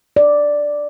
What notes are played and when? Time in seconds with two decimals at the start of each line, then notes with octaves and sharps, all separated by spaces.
0.16 D5